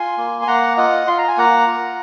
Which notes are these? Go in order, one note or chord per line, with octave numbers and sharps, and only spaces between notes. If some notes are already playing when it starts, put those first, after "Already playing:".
Already playing: F4 G#5 C6
A#3
G#5
A#3 F#5 A#5
F4 D#5 F#5
F4 C6
A#5
G#5
A#3 F#5 A#5
F4